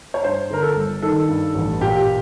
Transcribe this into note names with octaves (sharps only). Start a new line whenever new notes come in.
C#5
G2 C5
D3 A#4
A4
G1
D#3 A4
G2
A1
A#2 G4